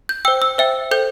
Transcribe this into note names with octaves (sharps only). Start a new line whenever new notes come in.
G6
C5 G5 E6
E6
C5 E5 G5
A4 C5 G5 G6